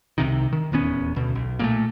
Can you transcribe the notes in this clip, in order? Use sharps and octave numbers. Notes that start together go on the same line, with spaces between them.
C2 C3 D#3
D#3
D#1 E2 B3 C#4
D2 B2
B1
A#2 G3 A3